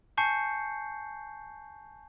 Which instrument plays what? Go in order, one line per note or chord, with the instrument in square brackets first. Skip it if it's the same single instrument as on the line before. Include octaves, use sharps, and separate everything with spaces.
[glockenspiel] G#5 A5 C#6 G6 C7 C#7